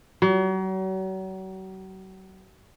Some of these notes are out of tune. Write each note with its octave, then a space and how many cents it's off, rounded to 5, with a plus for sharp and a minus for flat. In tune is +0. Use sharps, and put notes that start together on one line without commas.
F#3 +40